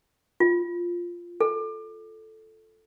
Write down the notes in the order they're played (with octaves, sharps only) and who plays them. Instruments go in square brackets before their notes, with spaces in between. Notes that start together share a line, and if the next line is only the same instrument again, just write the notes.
[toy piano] F4
A4